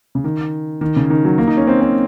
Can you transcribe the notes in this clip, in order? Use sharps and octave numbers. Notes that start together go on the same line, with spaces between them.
C#3
D#3
D#3
C#3
D#3
F#3
A#3
D#4
C#4
C4
C4